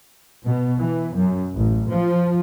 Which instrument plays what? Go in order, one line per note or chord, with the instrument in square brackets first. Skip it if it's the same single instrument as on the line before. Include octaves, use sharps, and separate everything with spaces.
[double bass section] B2
E3
F#2
A1
F3